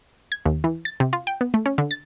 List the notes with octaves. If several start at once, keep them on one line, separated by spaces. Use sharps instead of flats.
G#6
D#2
E3
A6
C3
F4
G5
B3
A3
C#4
D3
A6